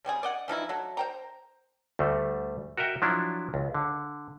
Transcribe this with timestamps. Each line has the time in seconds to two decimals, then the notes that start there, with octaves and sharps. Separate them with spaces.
0.05 C#3 G3 C4 G#4
0.23 D5 D#5 F#5
0.48 E3 F3 D#4 E4
0.69 F#3 A3
0.97 C5 G5 A#5
1.99 D2 G3 A3
2.77 F#4 A#4 D#5 E5 G5
3.02 F3 F#3 D4 E4
3.54 C#2
3.74 D3